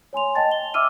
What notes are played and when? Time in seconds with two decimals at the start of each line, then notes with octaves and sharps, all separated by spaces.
0.13 C#5 G#5 C6 F7
0.35 D#5 G5 A5 A6
0.52 G7
0.74 E5 D6 E6 F6 D#7